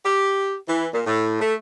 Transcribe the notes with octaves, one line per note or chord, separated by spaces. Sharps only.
G4
E3
A#2
A2
A3